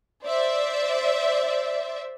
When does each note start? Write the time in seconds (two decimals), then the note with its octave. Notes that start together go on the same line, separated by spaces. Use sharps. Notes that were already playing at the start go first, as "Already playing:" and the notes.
0.24 C5 D5 E5